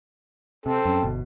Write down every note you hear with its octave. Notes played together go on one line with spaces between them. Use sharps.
C3 C4 A4
F#2
G1 B2